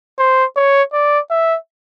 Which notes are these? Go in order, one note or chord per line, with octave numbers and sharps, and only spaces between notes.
C5
C#5
D5
E5